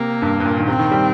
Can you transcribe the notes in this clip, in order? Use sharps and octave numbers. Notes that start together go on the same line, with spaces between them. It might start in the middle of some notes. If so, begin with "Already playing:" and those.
Already playing: C3 A#3
G2
G2
A#2
D#3
C3 C4
D#3
G3